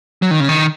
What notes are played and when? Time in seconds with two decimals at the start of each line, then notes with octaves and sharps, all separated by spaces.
0.22 F#3
0.31 D#3
0.40 C#3
0.49 D#3